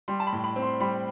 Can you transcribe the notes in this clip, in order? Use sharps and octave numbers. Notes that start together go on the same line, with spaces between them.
G3 C6
A5
B5
A2
B5
C4
C6
G3 B5